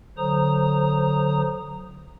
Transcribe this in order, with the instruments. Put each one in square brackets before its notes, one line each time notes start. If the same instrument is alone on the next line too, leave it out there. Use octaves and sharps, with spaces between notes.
[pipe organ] D3 F#3 C5 A#5 D#6